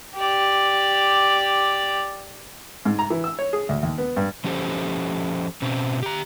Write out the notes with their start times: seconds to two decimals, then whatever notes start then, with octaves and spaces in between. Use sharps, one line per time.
0.17 G4 D5
2.85 G#2
2.99 A#5
3.10 E3
3.24 E6
3.39 C#5
3.53 G#4
3.69 D2
3.83 D#2
3.98 B3
4.17 G2
4.44 F3 C#4 G4 A4 C5
5.62 B2 C4 C#4
6.03 G4 A#5